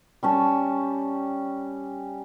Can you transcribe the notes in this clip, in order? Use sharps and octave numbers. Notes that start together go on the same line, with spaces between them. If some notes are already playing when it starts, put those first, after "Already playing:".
G3 C#4 A5